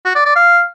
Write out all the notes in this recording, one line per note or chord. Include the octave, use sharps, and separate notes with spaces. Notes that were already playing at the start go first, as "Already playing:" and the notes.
F#4
D5
D5
F5